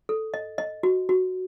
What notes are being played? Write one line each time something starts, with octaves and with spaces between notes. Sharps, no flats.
A4
D#5
D#5
F#4
F#4